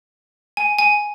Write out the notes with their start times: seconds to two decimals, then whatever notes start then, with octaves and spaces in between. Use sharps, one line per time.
0.57 G#5
0.78 G#5